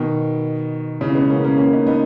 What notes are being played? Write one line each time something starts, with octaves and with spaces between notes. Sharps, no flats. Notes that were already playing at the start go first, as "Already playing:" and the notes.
Already playing: B2 D#3
C#3 E3
G#3 B3
A#3 C#4
A#3 C#4
A#3 C#4
B3 D#4
B3 D#4